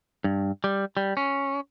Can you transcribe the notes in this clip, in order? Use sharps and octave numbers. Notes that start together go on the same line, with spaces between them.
G2
G3
G3
C#4